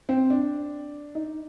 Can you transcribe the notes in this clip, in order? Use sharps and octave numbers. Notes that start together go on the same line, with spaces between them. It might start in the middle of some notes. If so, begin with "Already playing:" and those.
C4
D4
D#4